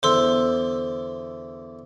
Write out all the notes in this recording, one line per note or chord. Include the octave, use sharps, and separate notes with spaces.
E2 D3 E4 C5 C6 E6